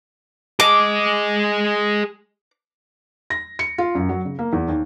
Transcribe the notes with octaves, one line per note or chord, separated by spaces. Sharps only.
G#4 D#5 D6
A#6
C#7
F4
F#2
F#3
C#3
A#3
E2
D#2